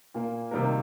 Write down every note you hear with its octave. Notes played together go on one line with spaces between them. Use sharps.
A#2 A#3
C3 D#3 G3 A#3 A#4